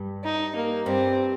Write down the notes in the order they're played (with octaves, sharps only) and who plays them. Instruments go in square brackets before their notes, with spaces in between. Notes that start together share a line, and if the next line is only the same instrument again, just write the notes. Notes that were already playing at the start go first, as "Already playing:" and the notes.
Already playing: [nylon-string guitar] G2 G3
[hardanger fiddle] D#4
A#3
[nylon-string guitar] G2 G3 [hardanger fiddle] C4